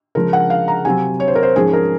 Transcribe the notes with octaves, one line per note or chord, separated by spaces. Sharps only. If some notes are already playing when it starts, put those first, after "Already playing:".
C#3 F3 G#3 A#4
F#5
F5
A#5
C3 F#3 C4 G#5
C#5
C5
A#4
C5
G#2 F3 G#3 C#4 G#4
A#4